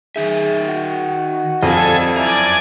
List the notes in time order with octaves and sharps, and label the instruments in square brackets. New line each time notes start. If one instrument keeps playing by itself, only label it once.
[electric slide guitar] D#3 D#4 E5 [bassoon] G#4
[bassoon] F#4
[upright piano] F2 [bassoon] G3 [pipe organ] A4 G#5 [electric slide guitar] D#5 F5
[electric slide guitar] F#2 A#5 [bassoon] E4 [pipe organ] D5 G#5